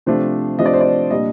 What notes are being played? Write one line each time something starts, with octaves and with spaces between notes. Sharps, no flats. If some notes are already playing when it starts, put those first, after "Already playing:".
C3 F3 A3 D4 C5
C3 F3 A3 D4 D#5
D5
C5
D5
A#2 G3 D4 D#5